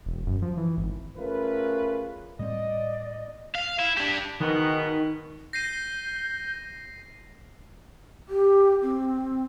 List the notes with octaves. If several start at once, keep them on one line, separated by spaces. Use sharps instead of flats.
E1
F#2
F3
E3
G#1
A3 C#4 F4 G#4 A#4 B4
A2 G3 C4 D5 D#5
F5
E4
D4 G4
B2 D#3 G#3 B3
G6 A#6 C7 D#7
G4
C4